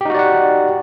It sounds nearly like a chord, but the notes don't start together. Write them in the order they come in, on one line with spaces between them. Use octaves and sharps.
G4 D#4 F#4 D5 F#5